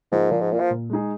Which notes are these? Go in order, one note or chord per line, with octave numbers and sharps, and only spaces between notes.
G#2 F3 A#3 F4
A#2 F3
G#2
A#2 A#3 F4
F3
A#2
G#3 D#4 G#4